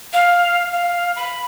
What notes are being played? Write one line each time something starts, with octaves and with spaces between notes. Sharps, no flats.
F5
F5
B5